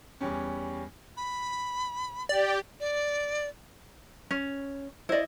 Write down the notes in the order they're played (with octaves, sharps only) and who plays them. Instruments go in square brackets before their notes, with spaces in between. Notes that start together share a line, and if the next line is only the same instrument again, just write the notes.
[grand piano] E2 G3 C#4
[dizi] B5
[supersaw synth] G4 [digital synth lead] D5
[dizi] D5
[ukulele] C#4
[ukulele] E4 D#5 [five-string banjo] C5 D5